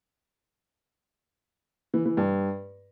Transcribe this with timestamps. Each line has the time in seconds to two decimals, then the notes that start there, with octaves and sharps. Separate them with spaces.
1.94 E3
2.05 E3
2.17 G2